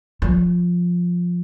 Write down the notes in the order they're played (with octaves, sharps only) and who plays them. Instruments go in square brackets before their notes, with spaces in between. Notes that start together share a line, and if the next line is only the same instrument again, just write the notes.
[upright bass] F3